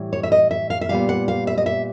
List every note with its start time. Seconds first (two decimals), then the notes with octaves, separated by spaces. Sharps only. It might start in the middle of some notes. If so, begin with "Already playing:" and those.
Already playing: A2 E3 G3
0.13 C#5
0.23 E5
0.32 D#5
0.51 E5
0.70 F5
0.81 E5
0.89 A#2 G3 B3 F5
1.09 F#5
1.28 F5
1.47 E5
1.58 D#5
1.66 E5